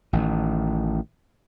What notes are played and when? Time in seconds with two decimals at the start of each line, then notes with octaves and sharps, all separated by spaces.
0.13 A1 D#3